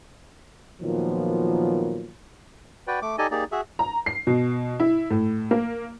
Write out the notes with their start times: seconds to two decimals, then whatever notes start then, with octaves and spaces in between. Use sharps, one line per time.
0.80 A#2 D#3 F3 F#3 B3
2.87 F#4 B4 D5 G5
3.02 A3 D6
3.18 D#4 G4 A4 D5 D#5 G#5
3.31 A#3 D#4 G4 G#4 D5
3.52 F#4 G#4 E5
3.79 A#5
4.06 C7
4.27 B2
4.80 E4
5.11 A2
5.51 A#3